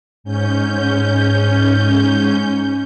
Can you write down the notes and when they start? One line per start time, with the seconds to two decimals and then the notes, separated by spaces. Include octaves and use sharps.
0.24 G#2 C#4 G6